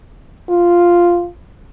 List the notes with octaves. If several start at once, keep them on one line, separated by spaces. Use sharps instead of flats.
F4